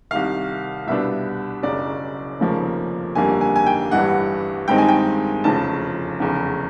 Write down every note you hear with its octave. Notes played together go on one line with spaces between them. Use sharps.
C2 C3 D#3 F5
C2 B2 G3 B3 D4 E5
F#1 F#2 C#3 F#3 D5
F1 D#2 C#3 F3 A#3
G1 F2 D3 G3 A#3 G#5
G#5
G#5
G5
A1 G2 E3 G3 F#5
G2 D#3 G#3 C4 D#4 G5
G#5
G5
F1 E2 C#3 F3 A5
F1 E2 C#3